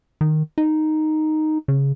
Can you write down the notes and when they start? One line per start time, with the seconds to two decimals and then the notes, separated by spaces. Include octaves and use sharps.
0.21 D#3
0.58 D#4
1.68 C#3